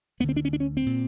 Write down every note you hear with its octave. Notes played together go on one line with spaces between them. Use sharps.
D2 D3 B3
C4
D4
C#4
D4
C#4
C4
A#2